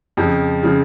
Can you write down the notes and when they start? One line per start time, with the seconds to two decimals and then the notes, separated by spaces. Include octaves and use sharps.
0.17 F2 C#3 F3
0.63 C#3 F3